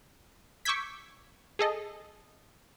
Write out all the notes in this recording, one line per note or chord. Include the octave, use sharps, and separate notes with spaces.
C#6 D6 E6 G6 G#6 B6
G#4 A4 D#5